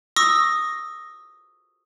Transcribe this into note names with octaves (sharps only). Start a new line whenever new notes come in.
C#6 D#6 E6 A#6